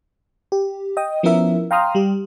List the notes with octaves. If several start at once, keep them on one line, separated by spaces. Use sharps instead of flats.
G4
D#5 G5 D#6
F3 B3 C#4 E4 A#4 E5
F5 G5 A#5 C6 D#6 F6
G3 G4